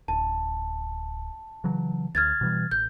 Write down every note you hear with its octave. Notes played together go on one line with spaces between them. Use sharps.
D1 A5
C#3 E3 F#3
D2 F6 G#6 A6
B2 E3 G3
A1 G6